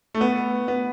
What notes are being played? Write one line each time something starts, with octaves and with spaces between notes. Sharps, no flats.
A3
B3
B3